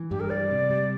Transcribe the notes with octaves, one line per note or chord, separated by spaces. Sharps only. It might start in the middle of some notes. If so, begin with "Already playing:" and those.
Already playing: E3
G2 G4
A#4
G3 D5
C3
G3